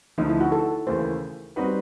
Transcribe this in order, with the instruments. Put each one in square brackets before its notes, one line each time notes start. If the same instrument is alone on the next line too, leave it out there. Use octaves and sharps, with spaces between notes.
[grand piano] D2 D3 F3 A3 [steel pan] D#4
[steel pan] E4
F#4
A4
[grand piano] D#2 C#3 E3 A3 [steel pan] C5
[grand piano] G3 C4 D#4 F#4 B4